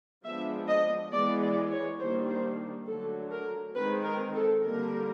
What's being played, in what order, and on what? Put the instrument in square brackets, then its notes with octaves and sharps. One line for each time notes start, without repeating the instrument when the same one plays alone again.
[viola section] F3 G#3 B3 D4 E5
D#5
E3 G#3 B3 D5
D5
C#5
D#3 G3 A#3 D4 C5
C5
D3 F#3 A3 A4
A#4
D#3 G#3 C4 B4
A#4
A4
D3 G3 A#3 A#4